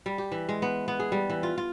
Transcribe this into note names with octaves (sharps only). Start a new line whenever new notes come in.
G3
G4
E3
G#3
B3
B3
G#4
G3
E3
F4
F4